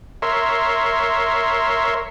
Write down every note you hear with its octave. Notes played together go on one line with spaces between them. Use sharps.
A#4 C#5 E5 C6